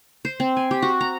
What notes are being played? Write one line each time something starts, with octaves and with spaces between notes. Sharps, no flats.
C5
C4
G#5
G4
F#4
A#5